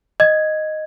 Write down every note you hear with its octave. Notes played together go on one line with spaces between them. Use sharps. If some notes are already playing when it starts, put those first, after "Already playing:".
D#5 G#6